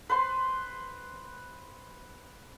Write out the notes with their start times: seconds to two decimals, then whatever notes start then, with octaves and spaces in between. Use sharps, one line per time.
0.09 B4 C5 C6